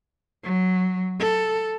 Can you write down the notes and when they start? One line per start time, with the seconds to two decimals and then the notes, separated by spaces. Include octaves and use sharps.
0.43 F#3
1.20 A4